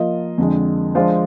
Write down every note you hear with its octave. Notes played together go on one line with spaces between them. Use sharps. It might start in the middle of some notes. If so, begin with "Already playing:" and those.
Already playing: F3 A#3 F4 A#4 D#5
F2 D3 G#3
F3 G#3 D4 F4 C5